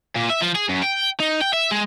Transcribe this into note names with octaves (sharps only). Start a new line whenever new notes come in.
A#2
E5
F3
G#4
F#2
G5
D#4
G5
E5
G#3